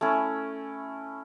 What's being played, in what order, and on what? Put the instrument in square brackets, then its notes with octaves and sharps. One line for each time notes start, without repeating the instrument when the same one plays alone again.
[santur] A3 C#4 E4